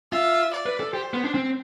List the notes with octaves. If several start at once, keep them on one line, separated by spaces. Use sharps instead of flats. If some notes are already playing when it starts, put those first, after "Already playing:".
F4 E5
D5
B4
A4
G4 C5
B3
D4
C4